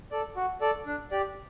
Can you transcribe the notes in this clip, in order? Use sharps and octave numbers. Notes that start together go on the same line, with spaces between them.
A4 D5
F#4
A4 D5
D4
G4 D5